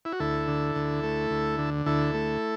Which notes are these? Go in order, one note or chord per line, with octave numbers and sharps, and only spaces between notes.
E4
F#4
D2 E4 A4
D3
D2
A3
D2
D3
D2 E4 A4
A3